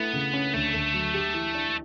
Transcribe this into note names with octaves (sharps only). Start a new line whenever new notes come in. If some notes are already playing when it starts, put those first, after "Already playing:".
Already playing: A3 B3 E4
C#3
C#4
D2 A3
D2
F#3
G4
E3
D4